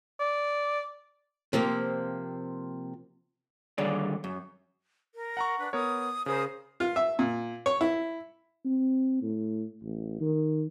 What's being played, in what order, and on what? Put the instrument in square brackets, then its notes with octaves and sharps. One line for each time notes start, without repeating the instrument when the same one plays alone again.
[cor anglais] D5
[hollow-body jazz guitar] C3 F3 A#3 C4
D#2 D3 G3 G#4 C#5 D5
F#2
[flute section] A#4
[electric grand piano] F#5 A#5 C#6
[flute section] D4 B4
[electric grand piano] B3 A#4 C#5 [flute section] D#6
[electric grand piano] C#3 G#4 [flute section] A#4 C5 D#6
[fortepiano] F4
E5
A#2
C#5
E4
[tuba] C4
A2
A1
D#3